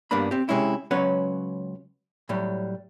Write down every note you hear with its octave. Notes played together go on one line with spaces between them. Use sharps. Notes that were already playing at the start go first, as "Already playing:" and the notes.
G2 G3 A#3 B3 D4 B5
C4 G4
C3 E3 G#3 C#4 E4
C#2 F#3 C#4 B4 C#5 F#5
A2 F#3 G3